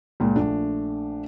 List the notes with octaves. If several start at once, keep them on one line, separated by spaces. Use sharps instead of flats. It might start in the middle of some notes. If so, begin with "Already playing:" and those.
C#2 A#2
A#1 A3 D4